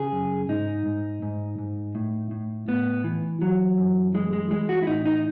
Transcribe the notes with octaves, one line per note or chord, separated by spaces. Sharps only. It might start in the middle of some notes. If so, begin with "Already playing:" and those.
Already playing: C#3 G#4
F#2
G#2 D#4
G#2
G#2
G#2
A2
A2
A2 B3
E3
E3 F#3
F#2
E3 G#3
G#3
E3 G#3
F#4
E4
A2 D#4
D#4